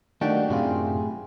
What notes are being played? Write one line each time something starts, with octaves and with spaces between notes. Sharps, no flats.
D#3 A3 A#3 D4 F#4 G4 G5
F#2 A2 C3 E4 F4 G#4